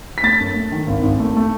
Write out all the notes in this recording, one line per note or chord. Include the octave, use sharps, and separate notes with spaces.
B6
A3 A6
F#2
A3
D#3
G#1
G#1
A3
A3